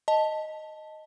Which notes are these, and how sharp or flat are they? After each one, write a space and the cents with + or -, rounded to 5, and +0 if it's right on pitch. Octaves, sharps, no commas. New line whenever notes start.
D#5 +0 A5 +0